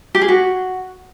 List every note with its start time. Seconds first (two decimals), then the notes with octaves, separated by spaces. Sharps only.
0.15 G4
0.21 G#4
0.28 F#4